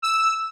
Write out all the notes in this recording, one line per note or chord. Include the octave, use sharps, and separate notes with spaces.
E6